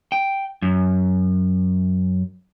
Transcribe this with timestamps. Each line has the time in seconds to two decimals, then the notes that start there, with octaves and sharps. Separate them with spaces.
0.12 G5
0.62 F#2